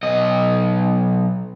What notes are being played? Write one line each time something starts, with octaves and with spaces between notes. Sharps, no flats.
B1 D#5